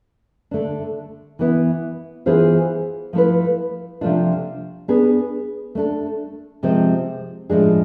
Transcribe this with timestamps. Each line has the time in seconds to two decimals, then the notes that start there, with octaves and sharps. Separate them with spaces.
0.51 D3 A3 D4
1.39 E3 B3 E4
2.26 E3 B3 F4 G#4 C5
3.13 F3 A3 E4 B4
4.01 C3 F3 A3 D4 F4
4.88 B3 D4 G#4
5.75 A3 D4 A4
6.63 C3 F3 G#3 C4
7.50 A2 F3 G#3 D4 G#4